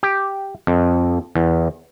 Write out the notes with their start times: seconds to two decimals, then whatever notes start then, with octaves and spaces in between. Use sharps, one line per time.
0.03 G4
0.67 F2
1.35 E2